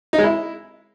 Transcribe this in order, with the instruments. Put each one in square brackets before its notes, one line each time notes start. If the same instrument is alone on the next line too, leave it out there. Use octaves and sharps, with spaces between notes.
[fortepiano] D#4
G#3
E4